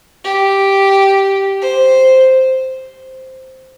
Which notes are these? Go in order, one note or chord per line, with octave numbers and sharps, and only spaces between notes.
G4
C5